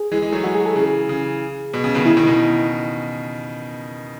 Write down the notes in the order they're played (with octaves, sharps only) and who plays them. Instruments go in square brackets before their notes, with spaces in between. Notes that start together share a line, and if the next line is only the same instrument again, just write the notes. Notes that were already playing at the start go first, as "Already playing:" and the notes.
Already playing: [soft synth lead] G#4
[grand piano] E3 G#3
E3 G#3
F#3 A3
[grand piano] E3 G#3 [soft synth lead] F#4
[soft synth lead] G#4
A4
[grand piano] C#3 E3 [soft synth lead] G#4
[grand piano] C#3
B2
C#3
B2 D#3
[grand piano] C#3 E3 [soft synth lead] E4
[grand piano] B2 D#3
B2 D#3